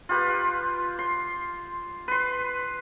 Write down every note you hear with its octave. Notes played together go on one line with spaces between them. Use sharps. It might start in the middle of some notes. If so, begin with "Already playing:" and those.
F4 G4 B4
C6
B4 C6